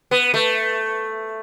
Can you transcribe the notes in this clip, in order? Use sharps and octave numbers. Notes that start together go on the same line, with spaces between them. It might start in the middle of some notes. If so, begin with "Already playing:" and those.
B3
A3